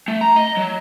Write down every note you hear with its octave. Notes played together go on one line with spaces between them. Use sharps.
A3
A#5
D#5
F#3